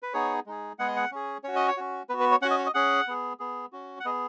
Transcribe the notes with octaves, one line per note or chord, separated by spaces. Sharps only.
B4
B3 D#4 G#4 C#5
G#3 D#4 G#4
G#3 B3 G#4 F#5
D#5
F#5
C#4 G#4
C#4 F#4 C#5
D#5
C#5
C#4 F#4
B3 F#4 B4
B4
C#5
C#4 F#4 F#5
D#5
C#5
D#5
C#4 G#4 F#5
B3 G#4
B3 G#4
C#4 F#4
F#5
B3 G#4 D#5